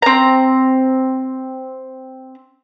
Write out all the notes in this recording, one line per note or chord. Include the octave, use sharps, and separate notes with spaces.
C4 A#5